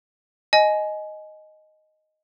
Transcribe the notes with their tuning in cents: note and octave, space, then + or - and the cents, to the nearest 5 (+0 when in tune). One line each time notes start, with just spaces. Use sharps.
D#5 +0 G#5 +20